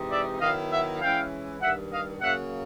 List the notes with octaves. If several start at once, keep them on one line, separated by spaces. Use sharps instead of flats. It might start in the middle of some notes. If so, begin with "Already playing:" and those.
Already playing: C3 E3 G#3 C4 D#4
D5 E5
D#3 F#3 B3 E4 D#5 F5
E5 F#5
E3 G#3 C#4 E4 F5 G5
G2 D#3 G3 E5 F#5
D#5 F5
C#3 F#3 A#3 E5 F#5